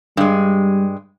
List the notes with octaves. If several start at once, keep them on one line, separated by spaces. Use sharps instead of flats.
G2 G3 G#3